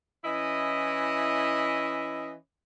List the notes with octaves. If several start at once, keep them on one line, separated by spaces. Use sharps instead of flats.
E3 C#4 E4 D#5